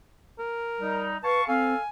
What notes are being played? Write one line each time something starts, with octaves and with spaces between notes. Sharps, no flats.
A#4
G3 D#4
B4 F5 A5 C#6
C4 A4 F5 G#5